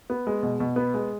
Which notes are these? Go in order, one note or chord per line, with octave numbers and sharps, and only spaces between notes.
B3
G#3
B2
B2
B3
G#3